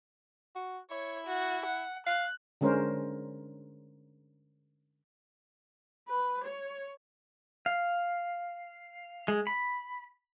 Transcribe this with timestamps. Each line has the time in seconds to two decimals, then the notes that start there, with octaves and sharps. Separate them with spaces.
0.55 F#4
0.91 E4 C#5
1.27 F#4
1.65 F#5
2.07 F5 F#6
2.61 D3 G#3 C#4 A#4 C5
6.09 B4
6.44 C#5
7.66 F5
9.28 G#3
9.47 B5